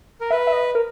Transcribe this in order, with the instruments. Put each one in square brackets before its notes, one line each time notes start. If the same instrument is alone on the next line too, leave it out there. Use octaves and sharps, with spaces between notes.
[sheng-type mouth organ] A#4
[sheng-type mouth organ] B4 [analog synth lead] E5
[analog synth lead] E5
D#5
A#4